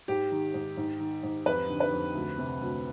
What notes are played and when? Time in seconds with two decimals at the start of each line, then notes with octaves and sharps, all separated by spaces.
0.08 G#2 G4
0.31 D#3
0.54 G#2
0.77 G#2
1.00 D#3
1.23 G#2
1.46 F2 B4
1.69 D3
1.80 B4
1.92 F2
2.15 D2
2.38 C3
2.61 D2